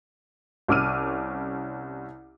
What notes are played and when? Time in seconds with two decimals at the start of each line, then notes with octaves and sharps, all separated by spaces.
0.68 C2 C#4 D6 E6 F6 D#7